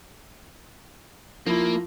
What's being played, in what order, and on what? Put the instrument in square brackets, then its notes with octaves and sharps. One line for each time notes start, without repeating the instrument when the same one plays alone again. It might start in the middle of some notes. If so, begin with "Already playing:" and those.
[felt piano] F3 E4 [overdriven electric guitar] A#3